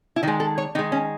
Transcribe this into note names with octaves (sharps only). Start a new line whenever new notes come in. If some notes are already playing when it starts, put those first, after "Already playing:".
E4
D#3 G#3 D#4
A4
C#5
D#3 G#3 D#4
C#4